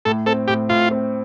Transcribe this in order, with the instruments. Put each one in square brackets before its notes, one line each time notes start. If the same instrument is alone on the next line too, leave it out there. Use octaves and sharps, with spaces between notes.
[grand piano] A2 [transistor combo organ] A4
[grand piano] C4 [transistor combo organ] A4
[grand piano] A2 [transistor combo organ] G4
[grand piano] A2 [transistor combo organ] F4
[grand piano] C4